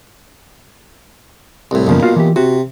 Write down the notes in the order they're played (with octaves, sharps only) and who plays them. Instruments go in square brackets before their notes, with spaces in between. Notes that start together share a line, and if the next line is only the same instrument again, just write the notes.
[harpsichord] C2 A2
[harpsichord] B1 A#2 [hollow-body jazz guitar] F#2 C#3 F3
[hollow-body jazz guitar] F4 F#4 F5
E3 G4
[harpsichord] C3 [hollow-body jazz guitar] F#4